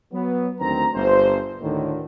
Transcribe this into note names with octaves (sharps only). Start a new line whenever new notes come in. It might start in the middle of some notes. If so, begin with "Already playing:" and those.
F#3 B3
D2 D#3 C4 A#5
G1 C5
D2 A2 D3 D#3